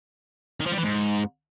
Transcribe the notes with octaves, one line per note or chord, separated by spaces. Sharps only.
D#3
F3
G3
E3
G#2